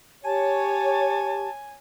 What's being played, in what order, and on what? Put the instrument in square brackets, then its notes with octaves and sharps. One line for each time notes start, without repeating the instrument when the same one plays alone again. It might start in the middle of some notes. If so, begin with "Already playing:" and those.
[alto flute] G4 [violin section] C#5 [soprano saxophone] G#5 [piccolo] A5